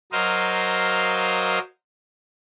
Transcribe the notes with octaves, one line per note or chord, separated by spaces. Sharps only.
F#3 A#4 C5 D#5 F5